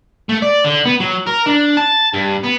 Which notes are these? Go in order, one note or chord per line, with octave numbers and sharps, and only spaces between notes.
A3
D5
D3
B3
F#3
A#4
D4
A5
G2
B3